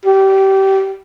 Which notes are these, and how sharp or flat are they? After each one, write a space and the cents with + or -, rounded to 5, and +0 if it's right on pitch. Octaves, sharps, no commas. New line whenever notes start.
G4 -25